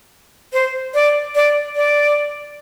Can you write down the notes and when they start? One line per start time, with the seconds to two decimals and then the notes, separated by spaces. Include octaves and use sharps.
0.53 C5
0.94 D5
1.35 D5
1.76 D5